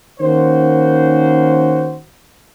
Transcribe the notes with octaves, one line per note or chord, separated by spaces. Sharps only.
D#3 A#3 C#4 F#4 C5